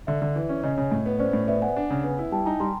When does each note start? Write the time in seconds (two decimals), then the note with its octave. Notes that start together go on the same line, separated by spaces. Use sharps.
0.07 D3 D5 E5
0.22 D3
0.36 E3
0.49 C#4
0.63 C#3 C#5 D#5
0.78 C#3
0.92 A2
1.06 B3
1.19 C#4 C5 D5
1.33 A2
1.47 B3 D5 E5
1.62 B3 F#5 G#5
1.76 D4
1.90 C#3
2.04 B3
2.19 E4
2.32 G3 G5 A5
2.46 D#4 G#5 A#5
2.60 G3 A#5 C6